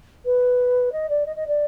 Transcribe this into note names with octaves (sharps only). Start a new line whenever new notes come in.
B4
D#5
D5
D#5
D#5
D5